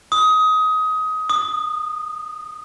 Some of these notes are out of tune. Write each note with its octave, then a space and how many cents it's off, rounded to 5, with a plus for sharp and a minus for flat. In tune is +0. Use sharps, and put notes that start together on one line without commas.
D#6 +20
D#6 -20